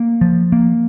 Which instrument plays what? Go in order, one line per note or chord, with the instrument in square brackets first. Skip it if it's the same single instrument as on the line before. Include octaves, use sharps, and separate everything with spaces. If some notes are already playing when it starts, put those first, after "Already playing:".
Already playing: [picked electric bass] A#3
F3
A#3